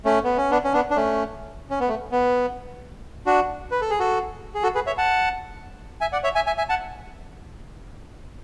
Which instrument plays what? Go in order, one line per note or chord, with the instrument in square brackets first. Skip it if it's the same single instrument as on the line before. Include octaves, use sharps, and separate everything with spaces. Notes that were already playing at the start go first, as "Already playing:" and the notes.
[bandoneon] A3 C#4
B3
C#4
B3 D4
C#4
B3 D4
D4
A3 C#4
C#4
B3
A3
B3
D4 F#4
B4
A4
G#4
F#4 A4
G#4
F#4 A4
G#4 B4
C#5 E5
F#5 A5
E5 G#5
D5 F#5
C#5 E5
E5 G#5
E5 G#5
E5 G#5
F#5 A5